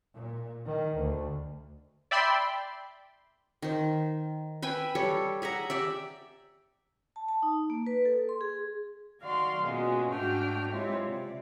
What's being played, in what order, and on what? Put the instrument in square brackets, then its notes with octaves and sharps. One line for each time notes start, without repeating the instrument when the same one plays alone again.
[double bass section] A#2
D#3
D2
[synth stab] D5 E5 G5 B5 C6
[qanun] D#3 C5
B4 E5 G5 G#5
G3 A4 C#5
G#4 E5 F#5 A#5
G4 D5 E5
[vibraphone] A5
A5
D#4
A#3
B4
A4
C6
G#4
[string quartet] D#3 F#4 D5 F5 C6
B2 G#3 A#3 C#4 F4 F#4
G#2 A3 D4 F#4 G5 F6
G#3 C4 E4 F4 G4 C#5
C3 D5